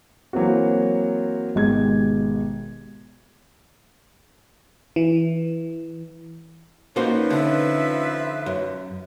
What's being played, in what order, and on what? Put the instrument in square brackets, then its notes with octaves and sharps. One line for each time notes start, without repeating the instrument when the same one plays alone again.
[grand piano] E3 F#3 A#3 C4 F#4
G#1 B2 G#3 G4 G#6
[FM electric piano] E3
[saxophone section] F3 F4 B4 [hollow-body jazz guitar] A#3 F#4 C5 [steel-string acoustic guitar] C#4 D#4
[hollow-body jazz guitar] D3 [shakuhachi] E5
[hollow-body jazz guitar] F#2